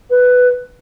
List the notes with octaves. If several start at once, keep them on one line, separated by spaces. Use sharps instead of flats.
B4